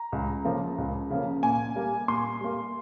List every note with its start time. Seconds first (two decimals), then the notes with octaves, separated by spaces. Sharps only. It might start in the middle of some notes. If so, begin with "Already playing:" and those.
Already playing: A#5
0.12 C#2
0.45 C#3 F3 A#3
0.78 C#2
1.10 C#3 F3 A#3
1.43 A#2 G#5
1.76 G3 A#3
2.08 A#2 C6
2.41 G3 A#3